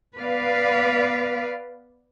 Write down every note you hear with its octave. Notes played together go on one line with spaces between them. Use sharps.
B3 B4 D5 F5